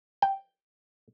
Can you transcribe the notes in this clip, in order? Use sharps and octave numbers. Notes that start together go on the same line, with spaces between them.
G5